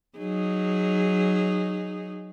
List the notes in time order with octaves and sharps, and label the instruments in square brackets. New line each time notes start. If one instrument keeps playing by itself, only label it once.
[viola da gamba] F#3 D#4 G#4